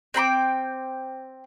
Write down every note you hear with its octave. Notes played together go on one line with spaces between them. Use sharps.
C4 G5 B5 D6